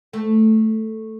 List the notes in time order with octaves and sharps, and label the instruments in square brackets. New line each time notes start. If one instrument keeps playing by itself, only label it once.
[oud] A3